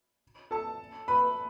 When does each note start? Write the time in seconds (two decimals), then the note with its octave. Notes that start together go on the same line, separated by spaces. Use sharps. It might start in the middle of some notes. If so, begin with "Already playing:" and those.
0.51 A4 A5
1.08 B4 B5